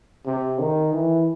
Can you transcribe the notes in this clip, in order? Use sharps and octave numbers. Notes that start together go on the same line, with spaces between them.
C3
D#3
E3